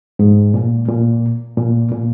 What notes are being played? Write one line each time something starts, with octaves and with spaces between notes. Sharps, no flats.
G#2
A#2
A#2
A#2
A#2